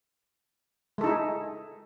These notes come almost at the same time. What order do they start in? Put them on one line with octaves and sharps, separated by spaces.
G#3 A4 D#4 E4 G#4